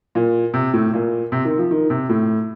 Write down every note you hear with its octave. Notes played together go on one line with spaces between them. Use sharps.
A#2
C3
A2
A#2
C3
D#3
F3
D#3
C3
A2